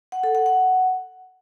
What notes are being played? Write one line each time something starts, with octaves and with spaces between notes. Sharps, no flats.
F#5
A4
F#5
F#5